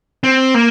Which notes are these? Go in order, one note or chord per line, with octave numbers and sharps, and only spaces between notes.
C4
A#3